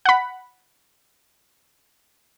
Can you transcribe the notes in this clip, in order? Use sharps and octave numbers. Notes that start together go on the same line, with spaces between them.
F#5 B5